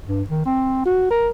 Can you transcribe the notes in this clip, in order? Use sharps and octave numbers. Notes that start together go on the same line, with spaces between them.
G2
D#3
C4
F#4
A#4